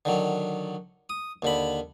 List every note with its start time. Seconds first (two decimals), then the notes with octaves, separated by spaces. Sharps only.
0.05 D3 D#3 F#3
1.09 D#6
1.42 D#2 D3 B5